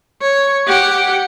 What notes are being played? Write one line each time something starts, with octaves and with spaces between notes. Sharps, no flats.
C#5
G4 F#5